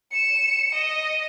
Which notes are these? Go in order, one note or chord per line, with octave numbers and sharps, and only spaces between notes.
C#7 E7
D#5